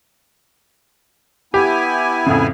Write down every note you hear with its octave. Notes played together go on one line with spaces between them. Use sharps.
B3 E4 G4 G#5
F2 A2 C#3